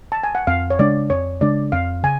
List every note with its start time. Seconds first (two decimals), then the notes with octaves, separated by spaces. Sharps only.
0.12 A5
0.23 G#5
0.35 F#5
0.47 F2 F5
0.70 C#5
0.79 C#3 G#3 D4 D5
1.10 F2 C#5
1.41 C#3 G#3 D4 D5
1.72 F2 F5
2.03 C#3 G#5